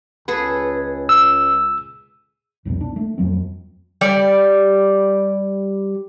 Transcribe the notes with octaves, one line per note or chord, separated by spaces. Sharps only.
C#2 G#4 A4 B4
E6
C2 F2 B2 B3
D4
A3
F2 F#3 C4
G3 G4 D5